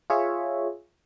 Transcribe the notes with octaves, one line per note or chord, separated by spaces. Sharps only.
F4 G#4 C#5 E5